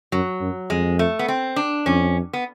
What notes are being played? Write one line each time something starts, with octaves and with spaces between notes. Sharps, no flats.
F#2 F#3
F#2
F2 G#3
A3
B3
C4
D4
F2 C#4
B3